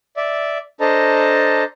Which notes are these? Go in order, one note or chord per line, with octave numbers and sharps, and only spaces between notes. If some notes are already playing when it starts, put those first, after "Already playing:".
D5 E5
D4 A4 C5 D#5 A5 A#5